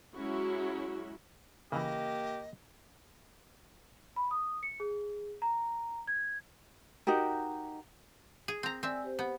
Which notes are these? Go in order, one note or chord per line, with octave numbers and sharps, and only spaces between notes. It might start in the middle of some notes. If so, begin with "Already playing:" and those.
F#3 G#3 C#4 E4 F#4
C#3 E3 A#3 G4 D#5
B5
D#6
C#7
G#4
A#5
G#6
D#4 F#4 G4 A#4
G#4
C4 A#5
C4 D5 E5 G#5 E6
G4 C5
B3